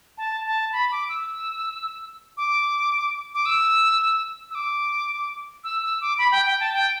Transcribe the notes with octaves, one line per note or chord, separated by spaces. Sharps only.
A5
A5
B5
D6
E6
D6
D6
E6
E6
D6
E6
E6
D6
B5
G5
G5
A5
G5